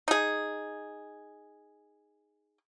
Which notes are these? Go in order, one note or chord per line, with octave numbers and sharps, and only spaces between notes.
D#4 G#4